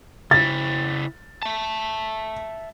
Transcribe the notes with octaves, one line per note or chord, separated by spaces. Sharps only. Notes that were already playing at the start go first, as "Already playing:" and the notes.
C#3 E4 A6
E5 A5